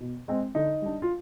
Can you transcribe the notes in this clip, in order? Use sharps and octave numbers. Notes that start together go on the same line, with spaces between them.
B2
G#3 C4
D3 D#4
G3 D4
F4